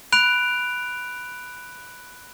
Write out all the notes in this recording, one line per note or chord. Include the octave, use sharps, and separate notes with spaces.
B5 F#6 D7 F7